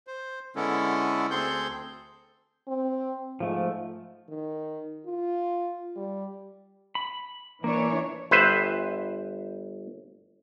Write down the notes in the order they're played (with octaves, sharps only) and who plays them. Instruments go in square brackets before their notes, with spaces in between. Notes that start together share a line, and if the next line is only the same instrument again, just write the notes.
[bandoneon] C5
D3 G#3 B3 C#4 E4 A4
D2 C4 G#4 A4 C6 G6
[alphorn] C4
[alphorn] G#2 [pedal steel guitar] F3 A3
[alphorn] D#3
F4
G3
[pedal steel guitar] B5
[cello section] E3 D4 C#5 [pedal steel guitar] A#3
[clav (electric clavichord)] G1 B4 C5 E5